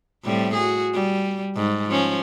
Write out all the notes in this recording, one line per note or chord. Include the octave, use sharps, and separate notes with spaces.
A2 G3 C4
F#4 G#4
G3
G#2
F3 C#4